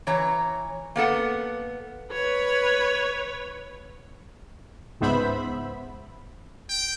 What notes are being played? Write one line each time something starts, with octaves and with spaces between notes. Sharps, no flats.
E3 C#5 A#5
A#3 B3 A4 F#5
B4 C#5
C#2 G#2 B3 C5 E5 B5
G5